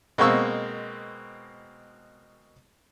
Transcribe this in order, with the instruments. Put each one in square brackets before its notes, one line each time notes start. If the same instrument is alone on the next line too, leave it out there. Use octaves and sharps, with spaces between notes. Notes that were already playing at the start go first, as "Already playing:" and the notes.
[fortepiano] B2 G#3 A#3 C4 C#6 E6